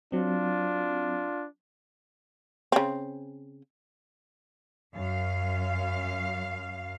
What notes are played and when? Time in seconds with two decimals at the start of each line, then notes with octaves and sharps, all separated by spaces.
0.12 F#3 C4 D4 F4
2.72 C#3 C4
4.94 F#2 F5